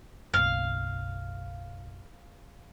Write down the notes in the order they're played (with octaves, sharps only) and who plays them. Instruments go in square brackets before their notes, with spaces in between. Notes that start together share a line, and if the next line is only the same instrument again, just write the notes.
[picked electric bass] F#1 B1 [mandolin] F5